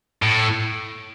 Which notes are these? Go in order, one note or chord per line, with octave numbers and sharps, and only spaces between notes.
A2